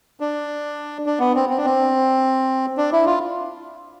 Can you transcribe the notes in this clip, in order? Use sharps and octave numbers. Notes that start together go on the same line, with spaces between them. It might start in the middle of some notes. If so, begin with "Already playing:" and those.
D4
D4
B3
C4
C4
D4
C4
D4
E4
F4